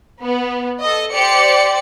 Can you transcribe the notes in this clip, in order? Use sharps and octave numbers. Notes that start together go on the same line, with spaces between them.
B3
A4 D#5
G4 C5 D5 C#7